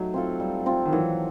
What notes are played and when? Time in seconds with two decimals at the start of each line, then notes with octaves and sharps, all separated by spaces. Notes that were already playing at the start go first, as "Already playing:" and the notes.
Already playing: F#3 A3 D#4 G4
0.14 C4 F4 A4
0.40 G3
0.66 C4 F4 A4
0.85 D#3
0.92 E3 F#3